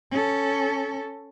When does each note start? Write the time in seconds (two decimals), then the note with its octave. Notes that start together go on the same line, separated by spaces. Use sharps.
0.11 C#4 A4